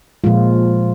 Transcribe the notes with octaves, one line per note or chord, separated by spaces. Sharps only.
A#2 F3 G#3 F4